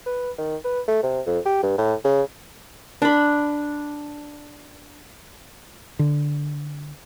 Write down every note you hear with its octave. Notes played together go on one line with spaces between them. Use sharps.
B4
D#3
B4
A3
C3
F2
G4
G2
A2
C#3
D4 B5
D3